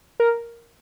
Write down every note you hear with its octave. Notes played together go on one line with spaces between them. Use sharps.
A#4